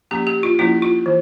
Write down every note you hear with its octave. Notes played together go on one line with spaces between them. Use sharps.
F3 A#3 C#4 G4
G4
F4
F3 A#3 C#4 E4
F4
E3